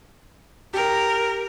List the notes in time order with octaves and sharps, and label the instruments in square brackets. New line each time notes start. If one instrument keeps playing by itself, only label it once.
[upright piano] G4 [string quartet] A#4